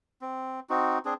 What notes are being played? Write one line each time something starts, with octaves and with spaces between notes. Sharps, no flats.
C4
C4 D#4 F#4
C4 D4 G#4